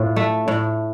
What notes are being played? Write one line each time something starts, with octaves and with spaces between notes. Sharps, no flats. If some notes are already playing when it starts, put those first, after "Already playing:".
Already playing: A2 F4
A3
A2